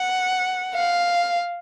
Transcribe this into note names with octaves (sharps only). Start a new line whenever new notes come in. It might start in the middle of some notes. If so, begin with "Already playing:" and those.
Already playing: F#5
F5